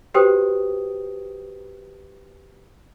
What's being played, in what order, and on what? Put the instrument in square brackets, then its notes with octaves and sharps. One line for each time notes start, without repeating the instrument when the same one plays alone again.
[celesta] F#4 G4 B4 C5 G5 D#6